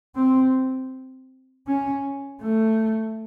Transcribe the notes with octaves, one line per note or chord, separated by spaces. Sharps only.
C4
C#4
A3